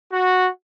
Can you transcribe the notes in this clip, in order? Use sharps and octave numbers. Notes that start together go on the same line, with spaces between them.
F#4